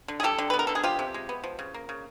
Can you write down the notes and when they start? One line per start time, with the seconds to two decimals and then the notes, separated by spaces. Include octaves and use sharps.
0.08 D3
0.20 G#4
0.23 G3 G4 A4
0.38 D3
0.50 B4
0.54 B3
0.59 A#4
0.67 D3 A4
0.75 G#4
0.83 F3 F4 G4
0.99 C3
1.14 G#3
1.29 B3
1.44 F3
1.59 C#3
1.74 A#3
1.89 C#3